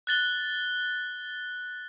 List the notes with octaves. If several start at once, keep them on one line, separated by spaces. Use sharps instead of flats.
F#6 A6 G7